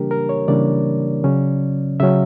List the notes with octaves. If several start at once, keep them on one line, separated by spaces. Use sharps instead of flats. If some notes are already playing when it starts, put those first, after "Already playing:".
Already playing: C#3 E3 G3 A#3 D4 G4 A#4
A#4
C#5
C#3 E3 G3 A#3 D4 D5
C#3 F#3 C#4
C#3 F#3 C#4 E5